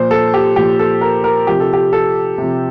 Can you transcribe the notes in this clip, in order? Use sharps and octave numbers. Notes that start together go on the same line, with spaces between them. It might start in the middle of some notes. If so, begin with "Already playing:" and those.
Already playing: A#2 F3 C5
A4
G4
A#2 F3 G4
A4
A#4
A#4
C3 F3 G4
A4
G4
A4
C3
F3